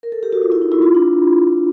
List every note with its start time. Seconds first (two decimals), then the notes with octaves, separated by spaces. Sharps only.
0.03 A#4
0.12 A4
0.23 G4
0.33 F#4
0.42 F4
0.52 E4
0.62 D#4
0.72 E4
0.82 F4
0.95 D4